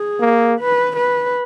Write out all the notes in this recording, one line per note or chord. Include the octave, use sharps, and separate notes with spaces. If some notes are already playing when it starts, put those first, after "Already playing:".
Already playing: G#4
A#3
B4
B4